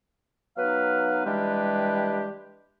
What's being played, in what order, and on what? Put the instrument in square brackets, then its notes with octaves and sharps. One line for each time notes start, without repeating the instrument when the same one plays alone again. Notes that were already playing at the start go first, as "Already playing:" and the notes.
[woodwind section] F#3 B3 D#4 B4 F5
E3 G3 G#3 D4 G4 B4